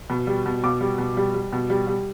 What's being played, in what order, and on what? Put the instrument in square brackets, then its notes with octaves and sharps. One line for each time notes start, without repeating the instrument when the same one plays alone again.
[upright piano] B2
G3
B2
B2 D6
G3
B2
G3
G3
B2
G3
G3